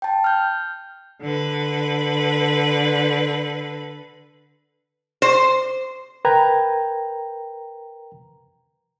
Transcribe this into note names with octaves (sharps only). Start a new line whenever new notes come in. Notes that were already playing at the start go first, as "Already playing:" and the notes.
G5 A5
F6 G6
D3 B4
C5
A#4 B4 G5 A#5 G#6